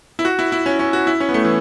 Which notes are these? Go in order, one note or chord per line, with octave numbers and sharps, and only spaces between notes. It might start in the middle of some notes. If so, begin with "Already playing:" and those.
E4
F#4
E4
E4
C#4
C#4
F#4
E4
C#4
B3
A3
E3